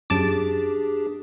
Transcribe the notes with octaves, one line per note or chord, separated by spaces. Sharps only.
F#2 D4 G4 G#4 A5 D6